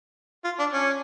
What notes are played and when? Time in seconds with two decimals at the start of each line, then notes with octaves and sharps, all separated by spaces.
0.44 F4
0.59 D4
0.73 C#4